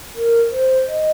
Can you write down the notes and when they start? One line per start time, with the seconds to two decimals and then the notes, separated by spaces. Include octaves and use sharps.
0.15 A#4
0.52 C5
0.88 D#5